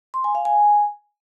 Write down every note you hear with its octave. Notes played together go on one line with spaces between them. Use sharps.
C6
G#5
F5
G#5